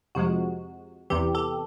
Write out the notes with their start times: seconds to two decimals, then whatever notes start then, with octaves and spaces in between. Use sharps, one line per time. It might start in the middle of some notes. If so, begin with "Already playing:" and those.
0.15 F2 C3 F3 G#3 F#4
1.10 E2 C3 E3 G4
1.35 G4 A4